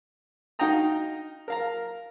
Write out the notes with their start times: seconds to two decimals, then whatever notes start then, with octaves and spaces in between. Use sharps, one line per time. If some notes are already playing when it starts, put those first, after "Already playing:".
0.59 D#4 F#4 F5 G5 A#5 D#6
1.48 A#4 F5 A#5